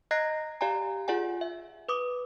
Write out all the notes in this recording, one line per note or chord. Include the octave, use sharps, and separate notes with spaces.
D#5 A#5 F#6 G#6 A#6 C7
G4 D5 F5 G#5 A#5
F4 G#4 D5 F#5 G#5
E5
B4 D6 D#6